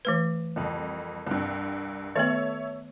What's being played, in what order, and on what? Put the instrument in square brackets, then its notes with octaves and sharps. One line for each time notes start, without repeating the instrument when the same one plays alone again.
[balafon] E3 A3 B4
[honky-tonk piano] C2 F2
C2 G2
[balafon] D#3 A3 B3 [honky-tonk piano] A4 C#5 E5